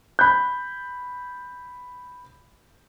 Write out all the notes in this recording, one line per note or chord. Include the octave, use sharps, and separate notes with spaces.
B5 G6